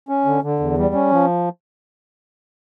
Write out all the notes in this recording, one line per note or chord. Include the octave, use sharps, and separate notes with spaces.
C#4
D3
D3
E2
G3
C#4
F3